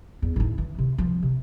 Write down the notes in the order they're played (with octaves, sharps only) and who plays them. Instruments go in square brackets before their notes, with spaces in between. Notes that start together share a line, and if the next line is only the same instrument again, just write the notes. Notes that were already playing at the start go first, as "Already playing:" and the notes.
[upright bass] E2
A2 D#4
E3
C3
F3
C3